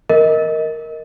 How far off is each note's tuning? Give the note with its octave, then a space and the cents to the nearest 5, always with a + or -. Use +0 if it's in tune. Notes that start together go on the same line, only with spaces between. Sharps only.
A#4 +0 D#5 +20